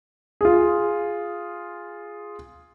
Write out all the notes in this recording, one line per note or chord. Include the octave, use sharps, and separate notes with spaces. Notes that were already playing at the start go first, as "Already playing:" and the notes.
F4 G#4